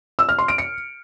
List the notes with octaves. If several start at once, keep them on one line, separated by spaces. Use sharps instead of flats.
E6
F6
C6
D7
C#7